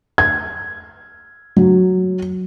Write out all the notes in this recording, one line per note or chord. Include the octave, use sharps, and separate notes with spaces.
G#6
F#3